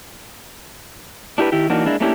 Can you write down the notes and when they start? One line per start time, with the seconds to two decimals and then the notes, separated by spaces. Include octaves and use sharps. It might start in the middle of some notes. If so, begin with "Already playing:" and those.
1.38 D4 E4 G4 A#4 B4
1.52 D#3 E4 G4
1.70 E3 F#3 A#3 D4 D#4 F#4
1.86 G#3 A#3 D4 E4
2.00 A3 A#3 C#4 D4 E4 G4